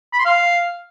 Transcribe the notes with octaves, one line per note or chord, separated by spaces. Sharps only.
B5
C6
F5